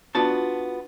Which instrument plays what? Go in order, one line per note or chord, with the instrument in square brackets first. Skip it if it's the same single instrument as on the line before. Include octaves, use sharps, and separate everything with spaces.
[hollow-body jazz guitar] B3 D4 F4 F#4 A5